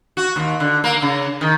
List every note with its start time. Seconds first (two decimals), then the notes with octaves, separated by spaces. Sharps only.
0.17 F#4
0.36 D#2
0.60 D3
0.84 A#3
1.02 C#3
1.41 D#3